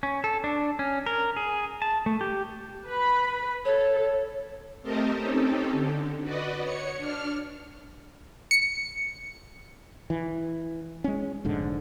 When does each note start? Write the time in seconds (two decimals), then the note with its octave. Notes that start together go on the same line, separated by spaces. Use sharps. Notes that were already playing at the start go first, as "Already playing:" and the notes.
0.03 C#4
0.24 A4
0.44 D4
0.79 C#4
1.06 A#4
1.36 G#4
1.82 A5
2.06 A3
2.21 G4
2.86 B4 B5
3.65 A4 C#5
4.82 A3 C4 G4 A4 A#4 D#5
5.17 C4 C#4 D#4 G4 A4
5.72 D3
6.22 F#4 B4 D5 D#5
6.60 C#5 C#7
6.97 D4 F6
8.51 C#7
10.10 E3
11.04 G#3 C#4
11.45 F1 G#2 D3